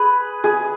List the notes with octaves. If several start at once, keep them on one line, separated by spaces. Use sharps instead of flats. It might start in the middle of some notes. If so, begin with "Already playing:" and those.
Already playing: G#4 B4
G#4